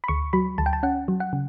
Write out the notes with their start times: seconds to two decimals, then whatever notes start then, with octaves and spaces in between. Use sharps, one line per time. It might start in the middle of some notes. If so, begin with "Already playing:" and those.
0.04 B5
0.08 D2 C#6
0.33 F#3 B5
0.58 D2 A5
0.66 G5
0.73 A5
0.83 C#4 F#5
1.08 F#3
1.20 F#5
1.33 C#3